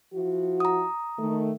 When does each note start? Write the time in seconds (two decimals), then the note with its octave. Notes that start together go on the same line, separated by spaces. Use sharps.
0.13 F3 E4 F#4
0.60 A#5 D#6
1.18 D#3 A3